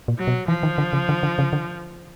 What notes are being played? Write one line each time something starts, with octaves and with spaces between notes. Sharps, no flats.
A#2
F#3
B2
E3 F3
D#3
D3
C#3
D3
D3
C#3
D3